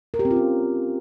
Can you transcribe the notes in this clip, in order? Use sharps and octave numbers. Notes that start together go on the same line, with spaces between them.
A#4
G4
C4
F4
C#4